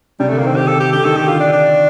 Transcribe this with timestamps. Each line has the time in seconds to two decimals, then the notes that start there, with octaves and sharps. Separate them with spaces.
0.20 C3 G3
0.29 D3 A3
0.39 A#3
0.43 D#3 C4
0.56 G4
0.68 A4
0.80 G4
0.93 D3 G4
1.05 D#3 A4
1.16 D3 G4
1.28 F4
1.40 D4
1.53 D4